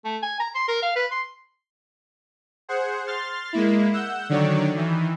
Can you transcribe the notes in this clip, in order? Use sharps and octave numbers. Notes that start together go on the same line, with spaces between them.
A3
G#5
A#5
C6
A#4
F5
B4
C6
G#4 C5 F#5
C6 F6 A6
G#3 A#3 E4
F#5 E6 G6
D3 D#3 F#3 C#5 D5
D#3 E3